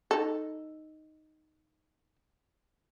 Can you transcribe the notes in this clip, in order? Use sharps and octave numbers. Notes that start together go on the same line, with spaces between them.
D#4 A4